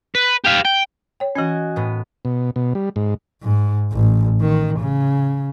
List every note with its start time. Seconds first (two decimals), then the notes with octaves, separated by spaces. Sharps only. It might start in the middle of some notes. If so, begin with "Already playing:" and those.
0.15 B4
0.44 G4 F5
0.65 G5
1.20 C#5 G5
1.35 E3 C#4 F#4 D#5 G#5
1.76 A2 B3
2.25 B2
2.56 B2
2.75 G3
2.96 G#2
3.43 G#2
3.92 A1
4.40 D#3
4.79 C#3